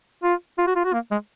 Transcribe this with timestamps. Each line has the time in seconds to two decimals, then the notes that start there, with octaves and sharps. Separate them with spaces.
0.23 F4
0.58 F4
0.67 F#4
0.76 F4
0.85 F#4
0.93 A#3
1.11 G#3